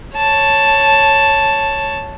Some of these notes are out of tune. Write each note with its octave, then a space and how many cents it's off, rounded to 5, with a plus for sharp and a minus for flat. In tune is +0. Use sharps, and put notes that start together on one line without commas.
C#5 +0 A5 +0